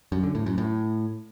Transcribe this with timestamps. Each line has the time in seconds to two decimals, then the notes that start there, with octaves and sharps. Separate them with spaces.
0.12 F#2
0.23 D3
0.35 A2
0.46 F#2
0.58 A2